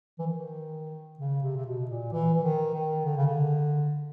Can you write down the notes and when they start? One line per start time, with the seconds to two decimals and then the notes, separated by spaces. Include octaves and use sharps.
0.19 E3
0.27 D#3
1.19 C#3
1.43 C3
1.56 C3
1.66 B2
1.89 A#2
2.12 E3
2.34 E3
2.43 D#3
2.74 D#3
3.05 D3
3.16 C#3
3.27 D3